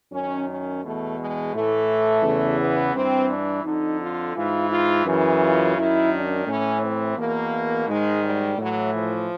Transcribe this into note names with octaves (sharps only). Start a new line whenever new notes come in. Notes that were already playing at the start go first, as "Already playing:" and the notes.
F#2 D#3 C#4
C#4
E2 B2 A3
G#3
A2 E3 A3
E2 C#3 E3
B3
G2 E3 C4
D4
F2 D3 D#4
F4
G#2 E3 F4
F4
F#2 C#3 E3
F4
F#2 D#3 E4
D4
A2 E3 C#4
C4
E2 B2 A#3
G#2 D#3 G#3
G3
A2 E3 F#3
F3